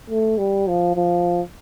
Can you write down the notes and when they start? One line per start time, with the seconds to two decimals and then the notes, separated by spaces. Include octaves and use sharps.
0.10 A3
0.38 G3
0.68 F3
0.96 F3